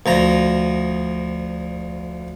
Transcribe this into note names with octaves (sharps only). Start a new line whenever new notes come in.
D2 F3 A#5